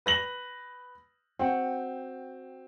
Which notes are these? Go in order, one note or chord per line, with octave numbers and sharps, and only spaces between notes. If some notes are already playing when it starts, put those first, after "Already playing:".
B4 A#6 F#7
C4 F#4 F#5 G5